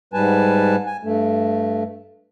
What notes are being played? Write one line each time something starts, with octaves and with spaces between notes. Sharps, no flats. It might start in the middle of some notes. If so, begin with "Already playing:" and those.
G#2 G3 B4 G#5 A5
G#5
G2 A3